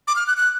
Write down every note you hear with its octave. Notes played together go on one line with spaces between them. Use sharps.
D6
F6
F#6
F#6